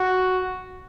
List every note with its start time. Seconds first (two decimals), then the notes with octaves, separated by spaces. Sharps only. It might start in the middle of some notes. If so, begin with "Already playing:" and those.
Already playing: F#4